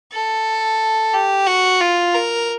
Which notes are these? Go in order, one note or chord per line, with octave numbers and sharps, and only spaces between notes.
A4
G4
F#4
F4
A#4